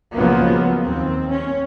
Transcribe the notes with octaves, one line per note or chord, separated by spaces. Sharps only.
C#2 F3 F#3 G#3 A#3 B3
D#2 C4
C#4